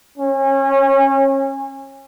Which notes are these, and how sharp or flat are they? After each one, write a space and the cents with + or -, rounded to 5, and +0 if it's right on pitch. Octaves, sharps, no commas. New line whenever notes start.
C#4 -30